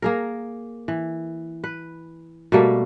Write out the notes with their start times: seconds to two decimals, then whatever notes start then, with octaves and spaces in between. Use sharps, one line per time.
0.02 A#3 G#4 A#4
0.88 E3
1.64 B4
2.52 B2 G3 A3 A#3